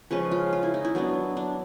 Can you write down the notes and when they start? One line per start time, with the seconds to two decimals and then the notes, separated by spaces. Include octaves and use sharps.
0.11 C#3 F3 G#3 C#4 B4
0.31 F4
0.53 F4
0.63 E4
0.74 D#4
0.85 E4
0.95 F#3 B3 D4
1.37 D4